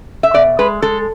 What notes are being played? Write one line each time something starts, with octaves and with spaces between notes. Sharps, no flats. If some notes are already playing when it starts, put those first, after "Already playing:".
E5
B2 D5
G#3 B4
G#3 A4